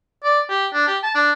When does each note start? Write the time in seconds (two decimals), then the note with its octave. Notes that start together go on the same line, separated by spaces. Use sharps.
0.24 D5
0.49 G4
0.73 D4
0.88 G4
1.03 A5
1.15 D4